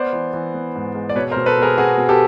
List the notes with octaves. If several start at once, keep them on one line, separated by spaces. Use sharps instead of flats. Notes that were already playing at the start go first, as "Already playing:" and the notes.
Already playing: B3 C5 D5
E3
E3
B3
G#2
G#3
D5
B2 B4 C#5
A#4 C5
B2
A4 B4
B2 G#4 A#4
B2 F#4 G#4
B2
G4 A4